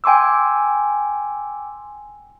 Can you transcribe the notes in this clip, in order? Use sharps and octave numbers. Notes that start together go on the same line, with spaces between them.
G5 G#5 C6 D6 E6